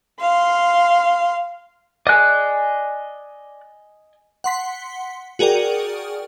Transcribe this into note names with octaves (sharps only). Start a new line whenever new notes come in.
F5 C6
D5 D#5 G#5 F#6
F#5 C6 B6
F#4 G#4 A#4 D5 G5